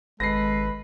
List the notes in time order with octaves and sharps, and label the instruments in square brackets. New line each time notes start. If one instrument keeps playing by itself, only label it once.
[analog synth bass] G#1 [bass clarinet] G#3 [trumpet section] A4 B4 [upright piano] A#6 C7